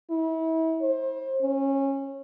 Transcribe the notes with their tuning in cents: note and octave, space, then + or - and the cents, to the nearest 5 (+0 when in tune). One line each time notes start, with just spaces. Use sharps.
E4 -35
C5 +30
C#4 -20